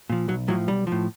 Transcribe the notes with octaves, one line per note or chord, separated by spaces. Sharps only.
A#2 F3
B1 F#3
A2 F3 F#3
B1 G3
A2 F3